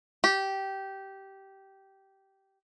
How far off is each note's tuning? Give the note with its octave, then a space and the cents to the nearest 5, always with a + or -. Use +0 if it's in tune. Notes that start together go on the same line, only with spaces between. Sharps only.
G4 -15